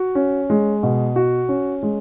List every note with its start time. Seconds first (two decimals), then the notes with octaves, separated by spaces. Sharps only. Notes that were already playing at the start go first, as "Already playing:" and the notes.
Already playing: F#4
0.15 C#4
0.50 G#3
0.83 B2
1.16 F#4
1.49 C#4
1.83 G#3